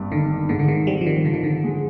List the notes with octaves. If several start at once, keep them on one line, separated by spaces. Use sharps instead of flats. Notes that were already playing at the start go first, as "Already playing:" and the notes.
Already playing: G#1 G2 G3
D3 D#3
G#2 D3
D3
D#3
G3 C4
F3
D#3
D3 F3
D#3
D3
G#3